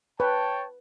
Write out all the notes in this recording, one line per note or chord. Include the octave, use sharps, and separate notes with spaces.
B4 C#5 G5 A5